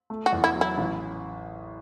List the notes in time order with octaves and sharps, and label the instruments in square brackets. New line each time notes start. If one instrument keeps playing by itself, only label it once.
[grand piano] A3
[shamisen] F#4
[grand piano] E2
[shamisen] E4
[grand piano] F#3
[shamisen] E4
[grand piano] A1